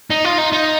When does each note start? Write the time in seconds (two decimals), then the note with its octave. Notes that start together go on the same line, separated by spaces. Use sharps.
0.10 D#4
0.25 F4
0.38 D#4
0.53 D#4